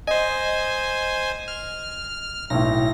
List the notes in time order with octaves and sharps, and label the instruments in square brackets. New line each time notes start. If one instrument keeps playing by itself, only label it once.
[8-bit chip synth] C5 G#5 [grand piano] D#5
[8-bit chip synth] F6
[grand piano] B1 A2 [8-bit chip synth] A#6